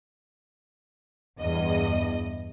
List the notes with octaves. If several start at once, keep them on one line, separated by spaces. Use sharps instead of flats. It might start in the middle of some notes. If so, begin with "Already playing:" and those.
E2 G2 D#5